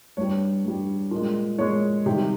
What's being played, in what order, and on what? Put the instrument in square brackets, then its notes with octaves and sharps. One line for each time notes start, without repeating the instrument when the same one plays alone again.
[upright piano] G2 G3 C#5
G2 G3
A#2
G#3
A#2 G#3 C#5
C3 D#3 G3 G4